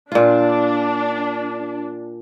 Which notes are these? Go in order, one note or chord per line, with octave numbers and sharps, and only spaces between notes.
A#2 D4 F4